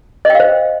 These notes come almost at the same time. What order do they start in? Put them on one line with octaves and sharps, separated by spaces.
D#5 G5 F5 C5